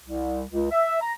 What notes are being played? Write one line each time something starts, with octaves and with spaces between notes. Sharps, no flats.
C2
C#2
E5
A#5